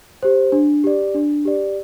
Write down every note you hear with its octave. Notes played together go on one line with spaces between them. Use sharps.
G4 C5
D4
G4 D5
D4
G4 D5